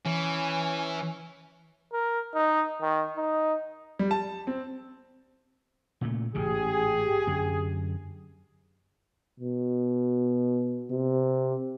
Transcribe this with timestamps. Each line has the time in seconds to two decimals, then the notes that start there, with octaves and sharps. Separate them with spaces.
0.05 E3 C#4
1.93 A#4
2.35 D#4
2.82 D#3
3.17 D#4
3.99 G3
4.11 A5
4.47 C4
6.01 A#2 C#3 A3
6.35 A1 G#2 C#3 G4 G#4
7.27 F#2 D3 F#3
9.40 B2
10.90 C3